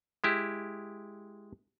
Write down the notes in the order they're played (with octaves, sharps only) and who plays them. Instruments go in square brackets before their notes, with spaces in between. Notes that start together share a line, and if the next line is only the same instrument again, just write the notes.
[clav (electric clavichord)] G#3 E4 G4